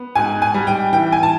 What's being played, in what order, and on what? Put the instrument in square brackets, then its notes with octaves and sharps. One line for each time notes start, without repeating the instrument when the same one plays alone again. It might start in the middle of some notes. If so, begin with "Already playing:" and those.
Already playing: [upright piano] B3
G#2 G#5
G#5
G3
G5
E3 G5
G#5
A5